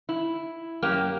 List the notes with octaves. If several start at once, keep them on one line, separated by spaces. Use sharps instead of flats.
E4
F#2 A#3 G4